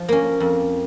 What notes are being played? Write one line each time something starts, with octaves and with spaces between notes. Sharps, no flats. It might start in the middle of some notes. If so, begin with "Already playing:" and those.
Already playing: F3
A#3 C#4
F2